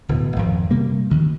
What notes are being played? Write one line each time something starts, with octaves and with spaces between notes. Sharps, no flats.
D1 B2 E3
G#1 F2
C3 G3 A#3
D2 D#3